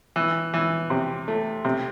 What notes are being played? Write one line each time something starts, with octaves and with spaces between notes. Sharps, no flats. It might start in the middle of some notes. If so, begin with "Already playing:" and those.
E3
E3
C3
A3
C3